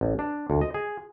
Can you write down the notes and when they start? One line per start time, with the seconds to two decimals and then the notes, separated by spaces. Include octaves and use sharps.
0.01 A1
0.19 D4
0.50 D2
0.61 D#5
0.74 G#4